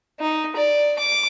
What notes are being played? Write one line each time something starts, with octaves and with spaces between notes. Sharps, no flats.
D#4
D5
D6